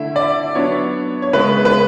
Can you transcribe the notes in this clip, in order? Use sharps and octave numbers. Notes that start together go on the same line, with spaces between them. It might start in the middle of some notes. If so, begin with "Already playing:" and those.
Already playing: D3 A3 E4 E5
D5
F#3 B3 D4 C#5
C#5
C#3 G#3 B3 B4
B4